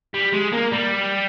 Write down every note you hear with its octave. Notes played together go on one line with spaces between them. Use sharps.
G3
G#3
A#3
G3